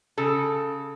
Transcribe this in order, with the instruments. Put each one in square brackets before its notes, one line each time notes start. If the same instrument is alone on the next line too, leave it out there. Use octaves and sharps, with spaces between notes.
[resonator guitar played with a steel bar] C#3 A4